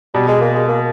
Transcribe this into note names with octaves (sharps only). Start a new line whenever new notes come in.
B2 G3
G#3
A#3
G#3
A#3